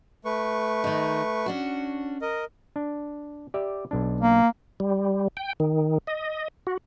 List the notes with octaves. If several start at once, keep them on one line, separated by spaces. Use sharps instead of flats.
A3 B4 C#6
D#3 D#4
C#4 D4 F#4
A#4 D#5
D4
G4 D5 E5
B1 D4
A#3
G3
G5
D#3
D#5
F#4